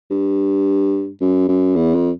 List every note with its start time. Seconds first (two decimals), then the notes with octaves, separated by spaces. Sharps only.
0.11 G2
1.21 F#2
1.48 F#2
1.76 E2
1.94 F2